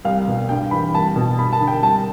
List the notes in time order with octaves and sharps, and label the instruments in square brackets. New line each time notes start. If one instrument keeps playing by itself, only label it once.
[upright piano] C2 F5
B2
G2 G5
E3 B5
C2 A5
B2
G2 B5
A5
D3
G5
C2 A5